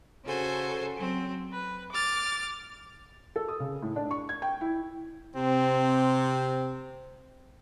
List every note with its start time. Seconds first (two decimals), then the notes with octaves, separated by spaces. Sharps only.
0.25 C#3 F#4 A4 C5 G#5
0.96 F#3 C4
1.52 B4
1.91 D6 F6 A6
3.36 A4
3.48 D#6
3.60 C#3
3.82 A2
3.96 D4
4.11 C#6
4.29 G#6
4.42 G5
4.61 E4
5.36 C3 C4